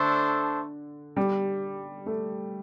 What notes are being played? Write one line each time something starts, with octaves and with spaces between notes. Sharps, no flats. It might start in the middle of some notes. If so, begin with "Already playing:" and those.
Already playing: D3 A3 D4 A4 C5
G3
A3